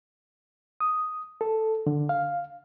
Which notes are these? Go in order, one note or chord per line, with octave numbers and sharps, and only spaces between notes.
D#6
A4
D3
F5